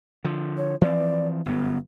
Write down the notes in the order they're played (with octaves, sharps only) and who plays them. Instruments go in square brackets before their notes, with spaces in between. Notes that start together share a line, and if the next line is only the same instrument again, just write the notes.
[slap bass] D3 F3
[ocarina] C#5
[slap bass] E3 F3 C4 [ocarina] D5
[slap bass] G1 F#2 [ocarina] B3